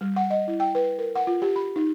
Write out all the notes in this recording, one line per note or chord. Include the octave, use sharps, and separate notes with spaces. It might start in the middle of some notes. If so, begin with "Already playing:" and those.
G3
F#5
D#5
E4
G5
B4
A#4
F#5
F4
G4
B5
D#4